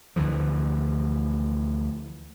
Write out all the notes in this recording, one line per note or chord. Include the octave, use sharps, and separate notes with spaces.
D2 D3 E3 F3